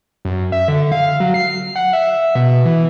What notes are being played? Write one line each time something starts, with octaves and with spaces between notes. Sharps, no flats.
F#2
E5
D3
F5
F#3
C7
F#5
E5
B2
E3